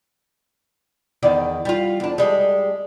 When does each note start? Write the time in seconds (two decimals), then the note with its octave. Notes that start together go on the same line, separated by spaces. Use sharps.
1.23 E2 D#3 D5
1.65 G3 F4
2.00 E2 D4
2.18 G3 G#3